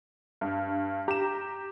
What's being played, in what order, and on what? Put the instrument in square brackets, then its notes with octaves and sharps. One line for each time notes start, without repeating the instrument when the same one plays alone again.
[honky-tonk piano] G2
[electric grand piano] G4 E7 [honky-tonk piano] A#5